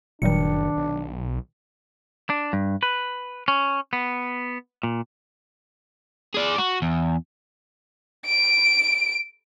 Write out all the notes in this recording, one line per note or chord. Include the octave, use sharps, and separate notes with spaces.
F#1 A#2 D#3 F#3 G3 D4 C#7
B1
D4
G2
B4
C#4
B3
A#2
G#4 D5
F#4
E2
D7